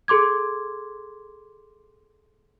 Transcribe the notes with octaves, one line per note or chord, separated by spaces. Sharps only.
G#4 A4 C6 D6 G#6